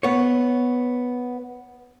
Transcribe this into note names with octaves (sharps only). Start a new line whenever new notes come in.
B3 C#5